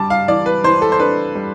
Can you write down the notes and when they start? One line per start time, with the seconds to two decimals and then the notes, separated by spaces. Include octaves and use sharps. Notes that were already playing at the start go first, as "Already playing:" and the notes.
Already playing: G3 D4 A5 D6
0.10 F5
0.28 E3 D5
0.46 B4
0.64 E3 C5
0.82 A4
0.92 C5
1.00 D4 B4
1.35 G3